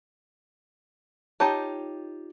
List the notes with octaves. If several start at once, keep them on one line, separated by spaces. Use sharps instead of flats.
D#4 F4 G4 C#5 A5